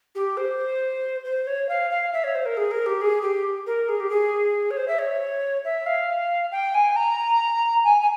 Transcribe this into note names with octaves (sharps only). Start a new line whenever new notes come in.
G4
C5
C5
C#5
F5
F5
E5
C#5
C5
A#4
G#4
A#4
G4
G#4
G4
A#4
G#4
G4
G#4
C#5
C5
E5
C#5
E5
F5
G5
G#5
A#5
G#5
G#5